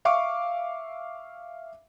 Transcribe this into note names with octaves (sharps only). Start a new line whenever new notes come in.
E5 F5 C#6 D6